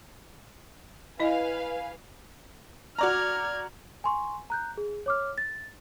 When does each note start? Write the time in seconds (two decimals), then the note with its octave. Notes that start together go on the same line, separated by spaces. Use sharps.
1.20 E4 B4 D#5 F5 G#5
2.99 F#4 D5 A#5 F6 G#6
4.04 G#5 C6 C#6
4.50 A#5 F#6 G6
4.78 G#4
5.06 C#5 D6 F6
5.38 A6